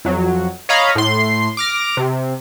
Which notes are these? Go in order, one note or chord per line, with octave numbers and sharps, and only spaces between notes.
F2 F#3
C#5 D#5 F5 A#5 B5
A2 C6
D6 F6 A#6
C3